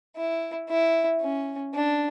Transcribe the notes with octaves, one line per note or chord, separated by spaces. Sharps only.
E4
E4
C#4
D4